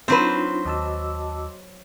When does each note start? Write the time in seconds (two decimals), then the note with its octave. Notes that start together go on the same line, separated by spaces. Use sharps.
0.08 F#3 C4 D4 D#4 F4 B4 C5
0.65 D#2 F#4 D#5 A5 D6 E6